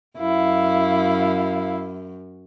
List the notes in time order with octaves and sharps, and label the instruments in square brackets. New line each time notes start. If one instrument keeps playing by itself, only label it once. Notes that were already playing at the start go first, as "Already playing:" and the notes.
[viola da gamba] F#2 [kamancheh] E4 F5